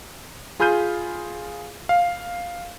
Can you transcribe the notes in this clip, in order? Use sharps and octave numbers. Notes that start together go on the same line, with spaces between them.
F4 G#4 B5 F6 G6 D#7
F5